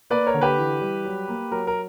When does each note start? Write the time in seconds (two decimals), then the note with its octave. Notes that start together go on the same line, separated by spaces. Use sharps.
0.10 A#3 B4 D5
0.27 A#4 C#5
0.34 D3
0.41 G4 B4
0.58 E3
0.81 G3
1.05 F#3
1.28 A#3
1.51 F#3 A#4
1.67 A#4